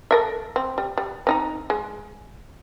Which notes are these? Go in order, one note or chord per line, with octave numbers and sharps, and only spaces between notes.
A4 A#4 E5
C4
G3
G3
C4 D#4 A#5
G#3